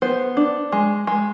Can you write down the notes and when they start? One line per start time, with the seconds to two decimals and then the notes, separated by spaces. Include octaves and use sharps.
0.02 B3 C5
0.37 D4
0.72 G#3
1.07 G#3